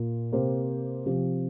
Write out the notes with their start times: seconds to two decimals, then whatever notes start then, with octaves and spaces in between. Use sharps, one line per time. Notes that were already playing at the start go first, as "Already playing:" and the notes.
Already playing: A#2 A#3 F4
0.33 C3 A#3 G4 C5
1.06 C3 F3 C4 G4